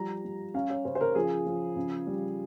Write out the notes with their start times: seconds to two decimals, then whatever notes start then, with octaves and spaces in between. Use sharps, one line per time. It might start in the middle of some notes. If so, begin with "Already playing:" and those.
Already playing: F3 G3 A#5
0.24 G3
0.54 C#4 F5
0.70 C#5
0.85 C#3 C5
0.95 C5
1.01 A#4
1.15 F3 G#4
1.46 F3
1.76 C#3
2.07 G3